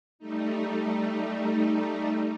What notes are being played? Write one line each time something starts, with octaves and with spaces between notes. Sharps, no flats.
G3 A3 D#4